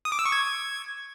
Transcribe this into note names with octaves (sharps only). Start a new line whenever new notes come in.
D#6
D6
E6
C#6
G#6